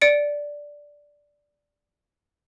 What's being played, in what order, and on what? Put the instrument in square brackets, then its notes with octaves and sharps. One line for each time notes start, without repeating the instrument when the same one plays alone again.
[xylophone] D5 C#7 D7